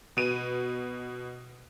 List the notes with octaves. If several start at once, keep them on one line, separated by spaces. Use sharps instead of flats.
B2 D#7